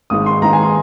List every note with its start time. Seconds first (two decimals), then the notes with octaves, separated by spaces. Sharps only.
0.10 G#1 G#2 D#3 D#6
0.26 C6
0.42 G#1 G#2 D#3 A#5
0.53 G#5
0.63 C6